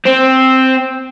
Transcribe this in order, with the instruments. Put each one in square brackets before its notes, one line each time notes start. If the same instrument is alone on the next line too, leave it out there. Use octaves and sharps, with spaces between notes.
[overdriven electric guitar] C4